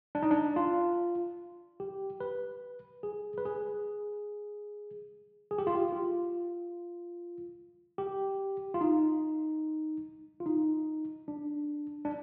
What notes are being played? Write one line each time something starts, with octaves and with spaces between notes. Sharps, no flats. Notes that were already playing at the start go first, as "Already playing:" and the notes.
D4
D#4
D4
F4
G4
B4
G#4
B4
G#4
G#4
G4
F4
G4
F4
G4
F4
D#4
F4
D#4
D4
D4